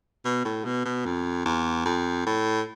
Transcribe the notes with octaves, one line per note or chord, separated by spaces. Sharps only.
B2
A2
B2
B2
F2
E2
F2
A2